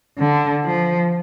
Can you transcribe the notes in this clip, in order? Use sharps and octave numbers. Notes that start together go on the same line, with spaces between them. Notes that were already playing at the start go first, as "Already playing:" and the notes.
D3
F3